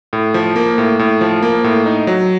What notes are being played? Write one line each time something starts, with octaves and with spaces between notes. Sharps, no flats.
A2
F3
A#3
A2
A2
F3
A#3
A2
D#4
F#3